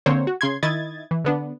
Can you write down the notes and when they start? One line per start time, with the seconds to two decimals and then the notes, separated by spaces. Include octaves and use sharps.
0.06 D3 A#3 C4 C5 C#5
0.27 F#4
0.41 C#3 C6 G#6
0.63 D#3 E4 D#5 G#6 A6
1.11 E3
1.25 D3 B3 D4